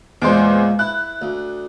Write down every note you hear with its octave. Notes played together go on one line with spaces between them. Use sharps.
E2 A#2 G#3 C5 D6
E4 F#6
D2